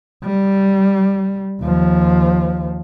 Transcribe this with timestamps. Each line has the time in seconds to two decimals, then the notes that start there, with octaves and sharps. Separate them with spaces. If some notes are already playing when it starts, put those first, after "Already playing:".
0.24 G3
1.61 D#2 F3